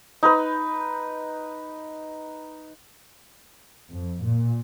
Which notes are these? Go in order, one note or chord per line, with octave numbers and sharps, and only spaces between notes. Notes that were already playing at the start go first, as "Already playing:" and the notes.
D#4 B4
F2
A#2